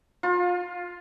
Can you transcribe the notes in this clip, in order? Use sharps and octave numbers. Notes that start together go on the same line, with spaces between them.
F4